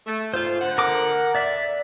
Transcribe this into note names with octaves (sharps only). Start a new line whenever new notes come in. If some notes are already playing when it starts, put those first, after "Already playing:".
A3
G#2 F4 C5
D3 F#5
A#4 D6
D5 E5